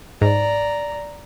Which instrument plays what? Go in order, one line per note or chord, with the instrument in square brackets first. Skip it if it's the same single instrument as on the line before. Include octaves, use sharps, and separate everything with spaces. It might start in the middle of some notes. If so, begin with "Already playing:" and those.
[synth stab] G#2 [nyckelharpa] D5 A#5